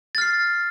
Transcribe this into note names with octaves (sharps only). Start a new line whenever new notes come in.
F6 A6 C7